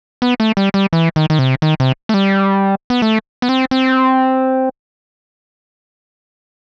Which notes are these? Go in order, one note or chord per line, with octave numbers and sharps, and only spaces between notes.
B3
A3
G3
G3
E3
D#3
D#3
C3
D#3
C3
A3
G3
B3
A3
B3
C4
C4